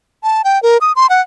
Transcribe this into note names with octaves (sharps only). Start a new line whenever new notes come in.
A5
G5
A#4
D#6
C6
F#5